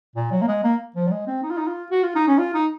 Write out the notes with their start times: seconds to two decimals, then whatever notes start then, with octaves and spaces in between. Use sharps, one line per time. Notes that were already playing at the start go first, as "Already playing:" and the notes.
0.16 A#2
0.31 F#3
0.42 A#3
0.48 G#3
0.64 A#3
0.96 F3
1.08 F#3
1.12 G#3
1.27 C4
1.43 D#4
1.51 F4
1.58 D#4
1.67 F4
1.91 F#4
2.03 F4
2.15 D#4
2.28 C#4
2.39 F4
2.55 D#4